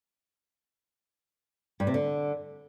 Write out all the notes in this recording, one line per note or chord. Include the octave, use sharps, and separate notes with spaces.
G2
C3
D3